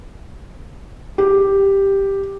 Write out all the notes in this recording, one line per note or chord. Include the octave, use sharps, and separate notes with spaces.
G4